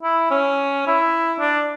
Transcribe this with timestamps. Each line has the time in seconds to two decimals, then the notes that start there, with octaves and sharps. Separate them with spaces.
0.03 E4
0.31 C#4
0.87 E4
1.40 D4